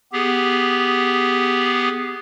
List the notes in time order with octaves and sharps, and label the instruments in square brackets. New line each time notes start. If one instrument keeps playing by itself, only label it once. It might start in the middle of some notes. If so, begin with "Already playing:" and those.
[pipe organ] B3 G4 G#4